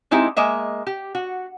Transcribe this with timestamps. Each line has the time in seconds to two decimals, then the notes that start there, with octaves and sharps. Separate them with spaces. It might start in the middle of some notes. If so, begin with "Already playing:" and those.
0.11 G#3 C4 D#4 E4 G4 A#5
0.37 G#3 A#3 D#5 E5
0.87 G4
1.15 F#4